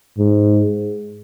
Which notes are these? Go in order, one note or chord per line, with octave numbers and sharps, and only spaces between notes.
G#2